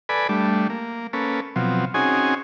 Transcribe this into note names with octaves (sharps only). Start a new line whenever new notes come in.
A4 B4 D5 G#5 B5
G3 A3 D4
A#3
A#3 C#4 A4 B4
B2 F3 F#3 C4
C4 C#4 D#4 F#4 G#4 G#5